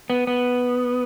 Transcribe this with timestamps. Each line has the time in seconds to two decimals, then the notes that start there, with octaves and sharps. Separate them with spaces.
0.10 B3
0.27 B3